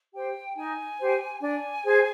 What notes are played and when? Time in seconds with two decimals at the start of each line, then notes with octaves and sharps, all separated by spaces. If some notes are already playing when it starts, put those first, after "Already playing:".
0.14 G4 C5 G5
0.56 D#4 G#5
0.99 G4 C5
1.40 D4 G#5
1.83 G#4 C5